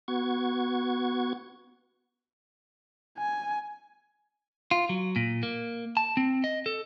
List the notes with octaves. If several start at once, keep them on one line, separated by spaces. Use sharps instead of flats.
B3 F#4 C#6 G#6
G#5
F4
F#3
A#2
A#3
A5
C4
D#5
A4